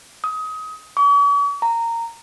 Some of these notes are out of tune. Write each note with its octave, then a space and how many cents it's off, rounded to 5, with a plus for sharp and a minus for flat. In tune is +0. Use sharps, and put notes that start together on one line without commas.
D#6 +25
C#6 +45
A#5 -15